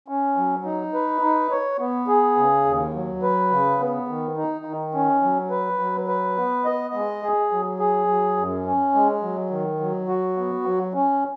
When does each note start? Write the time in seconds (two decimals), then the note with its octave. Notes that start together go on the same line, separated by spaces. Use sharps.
0.08 C#4
0.36 F#3
0.65 D#4
0.94 B4
1.22 D#4
1.51 C#5
1.79 B3
2.08 G#4
2.36 C#3
2.65 D#2
2.94 F#3
3.22 B4
3.51 C#3
3.79 B3
4.08 D#3
4.37 D#4
4.65 D#3
4.94 C#4
5.23 F#3
5.50 B4
5.79 F#3
6.08 B4
6.37 B3
6.65 D#5
6.94 G#3
7.23 G#4
7.51 F#3
7.79 G#4
8.08 F#3
8.37 F#2
8.66 C#4
8.94 G#3
9.22 F#3
9.50 D#3
9.80 F#3
10.08 F#4
10.37 B3
10.65 F#3
10.94 C#4